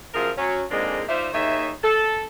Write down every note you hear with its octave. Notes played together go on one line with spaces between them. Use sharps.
F#2 F3 F4 G#4 A#4
F#3 C#4
F2 G#2 G#3 A#3 C4 D4
D#4 F4 C5 D5 E5
D#2 D#4 G#4 C#5 E5
A4